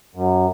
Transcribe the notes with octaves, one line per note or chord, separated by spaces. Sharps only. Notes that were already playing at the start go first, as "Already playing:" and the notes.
F#2